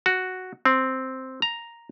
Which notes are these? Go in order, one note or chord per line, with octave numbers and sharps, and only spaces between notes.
F#4
C4
A#5